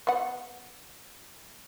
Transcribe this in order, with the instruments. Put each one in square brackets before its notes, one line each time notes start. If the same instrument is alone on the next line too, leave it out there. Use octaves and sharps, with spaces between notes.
[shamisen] B3 F#5